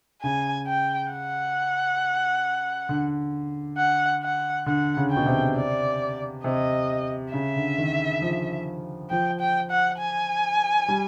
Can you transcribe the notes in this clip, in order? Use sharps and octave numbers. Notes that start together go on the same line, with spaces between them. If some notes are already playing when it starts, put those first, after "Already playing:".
C#3 G#5
G5
F#5
D3
F#5
F#5
D3 F#5
C#3
G5
B2
C3
D5
C3 D#5
C#3 E5
D3
D#3
F3
F3 G5
G5
F#5
G#5
G3